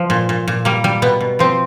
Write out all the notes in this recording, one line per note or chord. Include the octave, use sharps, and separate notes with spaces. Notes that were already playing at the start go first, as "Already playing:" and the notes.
Already playing: F3
A#2
A#2
A#2
G3 A#3
G3
B2 B3
B2
F3 C4